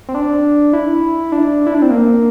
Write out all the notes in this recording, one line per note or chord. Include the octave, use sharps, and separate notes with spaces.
C4
D4
E4
D4
E4
D4
C4
A#3